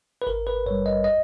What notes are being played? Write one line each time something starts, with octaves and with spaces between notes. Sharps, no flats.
B4
G#1 A#4
B4
G2 G3 C#5
D#5
D#5